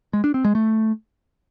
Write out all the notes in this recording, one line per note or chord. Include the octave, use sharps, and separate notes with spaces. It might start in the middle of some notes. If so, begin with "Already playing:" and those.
G#3
D4
C4
G#3
A3